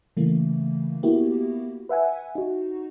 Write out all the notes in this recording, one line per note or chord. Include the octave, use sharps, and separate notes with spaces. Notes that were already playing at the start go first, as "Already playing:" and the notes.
C#3 E3 A3 A#3
A#3 B3 E4 F#4 G4
B4 E5 F#5 G#5
D#4 F#4